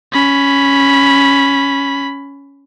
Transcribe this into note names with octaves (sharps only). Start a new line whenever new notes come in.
C#4 B5